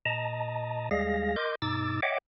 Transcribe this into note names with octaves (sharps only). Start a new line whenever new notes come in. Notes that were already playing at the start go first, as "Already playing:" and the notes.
A#2 D#5 A5 A#5
D#2 G3 G#3 G#4 F5 A#6
A#4 D#5 C6 D6 G6
G2 B2 D#4 D6 E6 A6
C#5 D#5 E5 F#5 G5 D6